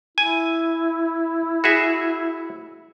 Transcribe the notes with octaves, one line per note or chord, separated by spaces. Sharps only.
E4 G#5
F#4 G#4 E5